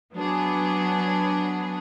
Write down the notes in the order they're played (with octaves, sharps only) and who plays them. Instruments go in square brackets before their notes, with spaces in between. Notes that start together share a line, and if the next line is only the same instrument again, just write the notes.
[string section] F#3 B3 D4 G#4